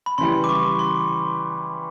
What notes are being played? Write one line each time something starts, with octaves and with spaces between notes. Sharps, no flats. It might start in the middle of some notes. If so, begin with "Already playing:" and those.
B5
C#3 E3 G3 C6
D6
C#6
C6